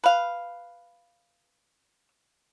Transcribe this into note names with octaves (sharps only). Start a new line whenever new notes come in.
B4 F5